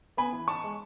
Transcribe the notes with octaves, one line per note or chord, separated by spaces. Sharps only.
B3 G#5 B5
E3
D#4 A5 C#6
G#3